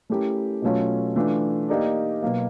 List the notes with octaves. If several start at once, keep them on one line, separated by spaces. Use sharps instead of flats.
A3 C#4 E4 G4 A#4
B2 F#3 A3 C#4 F4
E3 A3 D4 F4
A#3 D#4 G4 A#4 D5
B2 F#3 A#3